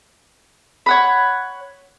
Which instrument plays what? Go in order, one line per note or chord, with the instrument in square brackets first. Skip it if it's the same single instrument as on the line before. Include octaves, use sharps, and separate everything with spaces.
[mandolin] C#5 F#5 B5